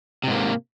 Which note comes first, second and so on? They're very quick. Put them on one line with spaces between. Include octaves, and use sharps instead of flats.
C3 G#2 A#3